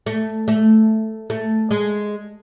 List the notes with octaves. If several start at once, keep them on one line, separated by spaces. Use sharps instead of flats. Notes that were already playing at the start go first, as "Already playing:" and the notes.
A3
A3
A3
G#3